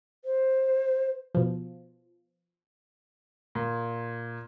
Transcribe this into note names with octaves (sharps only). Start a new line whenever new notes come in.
C5
B2 F3
A#2